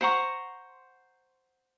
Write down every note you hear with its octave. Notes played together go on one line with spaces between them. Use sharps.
C5 F#5 A#5 C#6